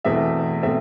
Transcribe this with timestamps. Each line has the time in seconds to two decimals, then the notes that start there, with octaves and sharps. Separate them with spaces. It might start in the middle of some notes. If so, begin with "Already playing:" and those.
0.04 E2 B2 A3 C4 E5
0.63 B2 A3 C4 E5